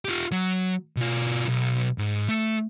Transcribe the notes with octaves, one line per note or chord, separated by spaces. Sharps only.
F4 G4
F#3
B2 F4
B1
G#2
A3